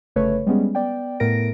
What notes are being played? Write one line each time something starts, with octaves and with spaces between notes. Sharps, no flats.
G1 C#3 A3 B4 C#5
G3 G#3 B3 C#4 G#4
B3 D5 G5
A2 A3 B3 A#4 A#6 D7